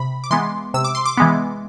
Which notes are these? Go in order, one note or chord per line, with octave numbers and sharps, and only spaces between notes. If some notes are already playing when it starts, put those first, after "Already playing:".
Already playing: C3 B5
D6
E3 G#3 B3 C6
C3 E6
D6
C6
D6
E3 G#3 B3